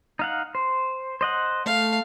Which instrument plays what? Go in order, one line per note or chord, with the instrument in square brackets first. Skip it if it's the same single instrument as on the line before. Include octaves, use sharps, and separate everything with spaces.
[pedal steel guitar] D#4 F5 F#5
C5
C5 D#5 F#5
[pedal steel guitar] A3 [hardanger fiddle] F5